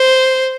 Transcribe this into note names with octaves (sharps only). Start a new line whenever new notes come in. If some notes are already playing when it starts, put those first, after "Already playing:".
Already playing: C5